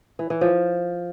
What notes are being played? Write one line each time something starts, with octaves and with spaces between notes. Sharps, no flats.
E3
E3
F3